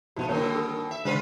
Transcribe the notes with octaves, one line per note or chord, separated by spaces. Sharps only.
B1 F3 B3 E4 F#4
G2 B2 D3 D#3 A#3 C#5
A4
E5
D3 G#3 B3 F4 B4 C5 B5 C6